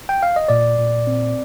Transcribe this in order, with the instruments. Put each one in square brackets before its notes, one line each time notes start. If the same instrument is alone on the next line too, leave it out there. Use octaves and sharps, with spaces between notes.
[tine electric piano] G5
F5
D#5
A#2 D5
A#2
C4